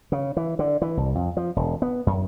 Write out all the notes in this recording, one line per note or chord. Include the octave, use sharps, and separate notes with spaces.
C#3
E3
D3
E3
C2
F2
F3
E1
B3
F#2